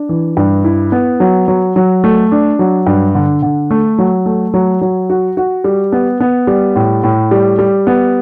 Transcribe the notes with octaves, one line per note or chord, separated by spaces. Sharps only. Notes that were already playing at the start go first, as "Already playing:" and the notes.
Already playing: D4
E3
G2
E4
B3
F#3
F#3
F#3
A3
D4
F#3
G2
D3
D3
A3
F#3
A3
F#3
F#3
F#4
F#4
G3
B3
B3
G3
A2
A2
G3
G3
B3